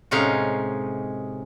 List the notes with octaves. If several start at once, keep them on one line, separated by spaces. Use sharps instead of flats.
A2 C3 G#3 C#4 D#4 F5